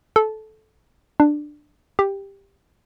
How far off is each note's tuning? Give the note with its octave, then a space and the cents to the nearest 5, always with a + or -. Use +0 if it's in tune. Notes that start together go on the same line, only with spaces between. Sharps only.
A4 -15
D4 +15
G4 +10